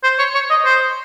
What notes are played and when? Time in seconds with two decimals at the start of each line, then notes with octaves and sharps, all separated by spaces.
0.03 C5
0.19 C#5
0.35 C#5
0.50 D#5
0.65 C5